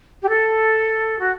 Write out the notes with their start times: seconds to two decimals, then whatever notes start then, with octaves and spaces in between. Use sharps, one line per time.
0.22 G4
0.29 A4
1.20 F#4